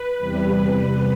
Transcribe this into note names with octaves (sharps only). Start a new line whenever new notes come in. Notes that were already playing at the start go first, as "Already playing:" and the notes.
Already playing: B4
E2 C3 G3